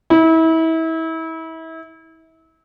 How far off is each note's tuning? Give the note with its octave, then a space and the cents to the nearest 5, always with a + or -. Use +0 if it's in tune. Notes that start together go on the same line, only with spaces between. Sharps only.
E4 -30